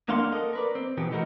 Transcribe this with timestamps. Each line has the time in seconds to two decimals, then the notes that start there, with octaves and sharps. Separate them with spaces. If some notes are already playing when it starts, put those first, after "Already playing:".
0.08 D#2 A#3 D4 F5 F#5 C6
0.32 A4 A#4 D#5
0.53 A#4 B4 D5
0.75 C4
0.98 B2 D#3 E3 B3 G4
1.11 E3 A3 D#4 F4 F#4 A#4